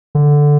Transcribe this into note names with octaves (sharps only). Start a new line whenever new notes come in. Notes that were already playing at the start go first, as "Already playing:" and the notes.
D3